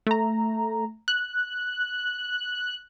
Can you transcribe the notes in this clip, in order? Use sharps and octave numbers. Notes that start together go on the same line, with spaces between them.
A3 A#5
F#6